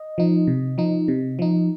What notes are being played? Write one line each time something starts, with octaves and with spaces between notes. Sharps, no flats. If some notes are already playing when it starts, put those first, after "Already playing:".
Already playing: D#5
F3 D#4
C3
F3 D#4
C3
F3 D#4